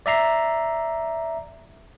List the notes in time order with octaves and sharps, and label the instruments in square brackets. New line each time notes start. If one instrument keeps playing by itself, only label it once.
[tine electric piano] D5 E5 A#5 C7